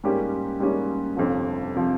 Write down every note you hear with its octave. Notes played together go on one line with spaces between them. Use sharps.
G#2 G3 A#3 C#4 G4
G#2 G3 A#3 C#4 G4
G1 F2 C3 F3
C3 F3